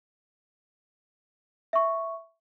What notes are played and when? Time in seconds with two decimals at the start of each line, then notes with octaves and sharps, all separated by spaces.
1.73 E5 C#6